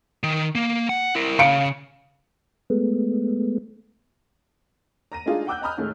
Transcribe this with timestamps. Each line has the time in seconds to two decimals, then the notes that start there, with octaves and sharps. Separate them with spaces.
0.23 D#3
0.55 A#3
0.89 F#5
1.15 E4 A#4
1.39 C#3 F5 C#7 D7
2.70 G#3 A3 B3
5.12 A#5 A#6 D#7
5.26 G#3 A3 D4 D#4 F4 G#4
5.47 F#5 G5 D6 E6 F#6 G6
5.61 D#5 G#5 A#5 B5 D#6 F6
5.77 D#2 A2 G#3 A3